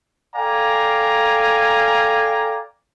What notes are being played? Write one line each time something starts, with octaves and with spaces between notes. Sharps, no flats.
A4 D5 F5 G5 G#5 A#5